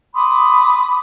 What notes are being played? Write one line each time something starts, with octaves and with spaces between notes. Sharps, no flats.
B5 C6 D6 D#6